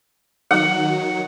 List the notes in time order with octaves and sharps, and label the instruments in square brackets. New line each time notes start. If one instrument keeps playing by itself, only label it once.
[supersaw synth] D#3 F#3 [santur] F#5